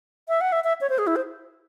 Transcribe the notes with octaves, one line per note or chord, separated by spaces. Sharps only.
E5
F#5
E5
E5
C#5
C5
G#4
E4
C5